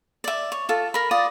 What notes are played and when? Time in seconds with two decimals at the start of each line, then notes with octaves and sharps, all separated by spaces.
0.24 D5 E5
0.52 C#5
0.69 F4 A4
0.94 A#4 B5
1.11 F4 D5 D#6